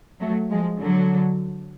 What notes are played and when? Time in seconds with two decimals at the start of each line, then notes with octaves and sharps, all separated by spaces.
0.20 F#3 A3
0.51 F3 G#3
0.80 D3 F#3